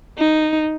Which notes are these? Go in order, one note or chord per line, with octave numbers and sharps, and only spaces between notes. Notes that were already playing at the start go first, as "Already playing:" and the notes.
D#4